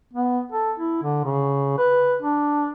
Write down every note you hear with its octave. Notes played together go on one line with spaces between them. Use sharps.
B3
A4
E4
D3
C#3
B4
D4